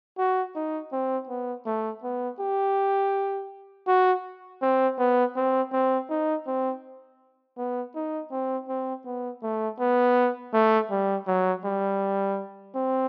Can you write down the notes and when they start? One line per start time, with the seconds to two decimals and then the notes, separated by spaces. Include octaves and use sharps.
0.18 F#4
0.55 D#4
0.92 C4
1.29 B3
1.66 A3
2.03 B3
2.40 G4
3.87 F#4
4.62 C4
4.99 B3
5.36 C4
5.72 C4
6.10 D#4
6.47 C4
7.58 B3
7.95 D#4
8.31 C4
8.68 C4
9.06 B3
9.43 A3
9.79 B3
10.54 A3
10.91 G3
11.27 F#3
11.65 G3
12.75 C4